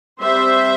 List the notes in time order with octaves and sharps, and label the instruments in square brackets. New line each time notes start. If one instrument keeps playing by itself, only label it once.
[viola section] G3 C4 C5 E5